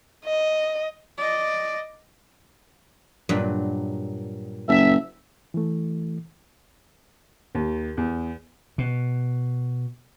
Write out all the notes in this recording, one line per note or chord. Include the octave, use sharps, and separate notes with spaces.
D#5
D5 D#5
G2 A#2 F#3
F#1 E5
E3 A3
D#2
E2
B2